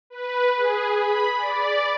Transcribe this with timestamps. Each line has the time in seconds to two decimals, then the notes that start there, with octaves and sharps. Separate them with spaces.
0.10 B4
0.56 G#4
0.92 B5
1.37 D5